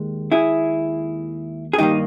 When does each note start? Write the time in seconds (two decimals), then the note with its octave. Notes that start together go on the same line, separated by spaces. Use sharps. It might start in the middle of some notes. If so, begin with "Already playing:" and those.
Already playing: D#2 G#3
0.32 E4 G#4
1.73 G#4
1.78 G2 D#3 A#3 D#4 G4